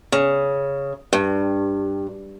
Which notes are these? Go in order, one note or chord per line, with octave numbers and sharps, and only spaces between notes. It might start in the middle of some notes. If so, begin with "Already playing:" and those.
C#3
G2